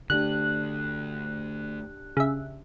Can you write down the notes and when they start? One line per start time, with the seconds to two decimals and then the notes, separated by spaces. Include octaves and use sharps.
0.10 D3 A3 D4 G4 F#6
2.17 C#3 E5